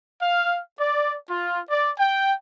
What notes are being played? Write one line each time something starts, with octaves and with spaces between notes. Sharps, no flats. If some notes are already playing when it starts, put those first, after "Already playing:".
F5
D5
F4
D5
G5